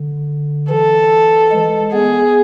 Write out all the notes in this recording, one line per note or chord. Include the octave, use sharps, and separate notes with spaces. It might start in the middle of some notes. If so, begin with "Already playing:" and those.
Already playing: D3
E3 A4
G#3
B3 G#4